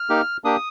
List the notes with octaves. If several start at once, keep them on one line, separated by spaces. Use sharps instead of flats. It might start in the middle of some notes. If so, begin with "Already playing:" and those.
Already playing: F6
A#3 D#4 G4
A#3 D4 G4 D#6